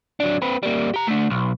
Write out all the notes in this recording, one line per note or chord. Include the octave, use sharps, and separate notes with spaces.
F#3 D4
C4 B4
G3 A#3
G4 A#5
A3 D4
B1